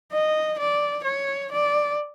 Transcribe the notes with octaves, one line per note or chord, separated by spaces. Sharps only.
D#5
D5
C#5
D5